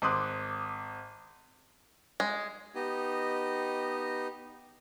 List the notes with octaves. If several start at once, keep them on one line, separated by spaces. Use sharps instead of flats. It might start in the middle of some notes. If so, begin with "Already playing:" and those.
G#1 C6 D6 D#6 F#6
G#3
B3 D#4 G4 D#5